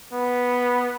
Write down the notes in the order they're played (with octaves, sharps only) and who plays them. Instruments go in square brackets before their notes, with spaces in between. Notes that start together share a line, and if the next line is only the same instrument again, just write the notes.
[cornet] B3